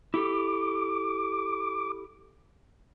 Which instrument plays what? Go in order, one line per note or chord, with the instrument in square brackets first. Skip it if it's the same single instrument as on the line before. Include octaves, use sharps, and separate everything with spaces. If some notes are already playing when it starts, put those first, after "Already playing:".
[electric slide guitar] E4 G4 A4 [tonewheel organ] D6